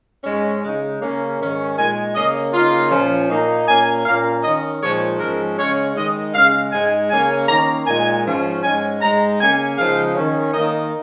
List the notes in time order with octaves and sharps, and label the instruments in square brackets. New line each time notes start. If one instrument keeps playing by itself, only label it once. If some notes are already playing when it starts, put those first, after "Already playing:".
[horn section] G#2 G#3 C#4
C#3 G#3 D#4
C#3 A#3 C#4
G#2 D#3 C#4
A#2 G#3 D#4 G#5
C#3 A#3 C#4 D#5
C#3 A#3 D#4 F4
A#2 F3 C#4
A#2 A#3 D#4
A#2 A#3 C#4 G#5
A#2 A#3 C#4 F5
D#3 C#4 D#5
A#2 F3 G#3 D#4 C#5
G#2 F3 G#3 C#4 A#4
C#3 G#3 C#4 C#5
D#3 G#3 D#4 D#5
C#3 G#3 C#4 F5
G#2 G#3 D#4 G#5
C#3 A#3 C#4 G#5
D#3 A#3 C#4 A#5
A#2 G#3 D#4 G#5
G#2 F3 C#4
G#2 G#3 C#4 G#5
G#2 G#3 D#4 A#5
C#3 A#3 C#4 G#5
C#3 F3 G#3 D#4 F5
D#3 C#4
D#3 A#3 D#4 D#5